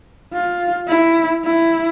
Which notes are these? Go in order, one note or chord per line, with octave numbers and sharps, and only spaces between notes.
F4
E4
E4